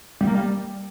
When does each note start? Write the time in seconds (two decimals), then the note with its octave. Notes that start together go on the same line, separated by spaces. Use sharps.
0.21 G3
0.27 A#3
0.35 G3